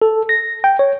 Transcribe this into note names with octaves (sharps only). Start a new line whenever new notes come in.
A4
A#6
G5
C#5